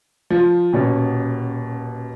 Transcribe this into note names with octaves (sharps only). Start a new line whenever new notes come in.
F3
D#1 B2 C#4